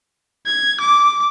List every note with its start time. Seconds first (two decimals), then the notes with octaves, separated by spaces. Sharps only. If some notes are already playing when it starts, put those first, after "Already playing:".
0.46 G#6
0.81 D6